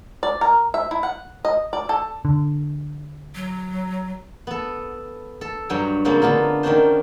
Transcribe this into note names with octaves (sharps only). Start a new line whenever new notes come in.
D5
A#4
E5
E4
F#5
D#5
D5
A4
D3
F#3
B3 A4
A4
G2 F#3 G5 G#5
C#3 F3 F#3 G#3 A#3 C4
D3 A#3 B3 F4
D#3 C#4 D4 C5